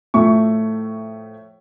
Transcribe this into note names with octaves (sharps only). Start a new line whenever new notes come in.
A2 F3 A3 E5 C#6